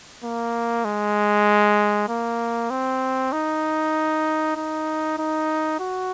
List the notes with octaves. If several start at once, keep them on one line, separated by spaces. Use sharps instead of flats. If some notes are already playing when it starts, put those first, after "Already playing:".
A#3
G#3
A#3
C4
D#4
D#4
D#4
F#4